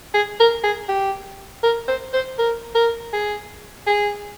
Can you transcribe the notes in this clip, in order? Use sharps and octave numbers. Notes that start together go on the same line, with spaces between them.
G#4
A#4
G#4
G4
A#4
C5
C5
A#4
A#4
G#4
G#4